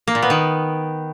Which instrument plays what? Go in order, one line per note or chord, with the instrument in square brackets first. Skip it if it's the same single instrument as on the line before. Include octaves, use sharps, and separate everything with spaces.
[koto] A#3
A#2
B3
D#3